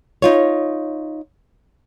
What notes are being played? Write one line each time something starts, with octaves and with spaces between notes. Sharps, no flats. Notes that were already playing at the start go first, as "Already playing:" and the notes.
D#4 F4 C#5